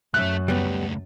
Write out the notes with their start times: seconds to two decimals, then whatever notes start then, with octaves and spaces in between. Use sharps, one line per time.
0.14 F#2 A3 E5 F#6
0.48 C#2 G3 A3 B3